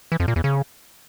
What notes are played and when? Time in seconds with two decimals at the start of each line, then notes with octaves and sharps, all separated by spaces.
0.12 E3
0.20 F2
0.28 A#2
0.36 E2
0.44 C#3